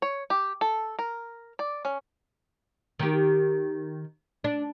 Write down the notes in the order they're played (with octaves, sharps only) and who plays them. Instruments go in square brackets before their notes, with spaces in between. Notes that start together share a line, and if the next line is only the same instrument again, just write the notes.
[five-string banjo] C#5
G4
A4
A#4
D5
C#4
[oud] D#3 G4
D4